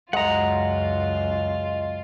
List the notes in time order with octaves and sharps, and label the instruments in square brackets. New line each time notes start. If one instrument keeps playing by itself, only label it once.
[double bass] C#2 F#2 [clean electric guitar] G#3 [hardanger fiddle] F4 [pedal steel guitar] F#5 A#5